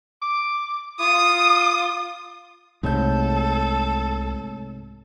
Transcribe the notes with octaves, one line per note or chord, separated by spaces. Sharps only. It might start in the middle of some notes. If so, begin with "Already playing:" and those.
D6
F4 D#6
C2 G#2 C3 G#3 A3 A4 C#5 G6